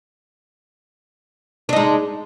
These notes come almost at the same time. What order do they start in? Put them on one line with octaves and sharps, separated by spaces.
D4 D#4 G#3